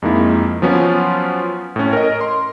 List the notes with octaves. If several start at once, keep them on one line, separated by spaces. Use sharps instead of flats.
F2 G#3 A#3 D#4 E4
F3 F#3 B3 C#4 F4
A2 C#4
A#4 D#5
C6